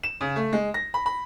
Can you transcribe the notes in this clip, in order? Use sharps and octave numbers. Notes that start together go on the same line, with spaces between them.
E7
C#3
A3
G#3
A#6
B5
B5